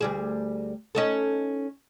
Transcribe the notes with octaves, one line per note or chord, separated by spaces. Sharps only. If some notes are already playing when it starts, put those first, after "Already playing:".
D2 G3 G#4
C#4 D#4 A4